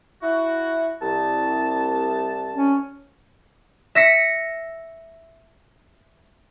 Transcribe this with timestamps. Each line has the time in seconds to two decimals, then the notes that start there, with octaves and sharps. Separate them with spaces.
0.22 E4 F#4
1.01 C2 A5
2.54 C#4
3.95 E5 A#6 B6 C#7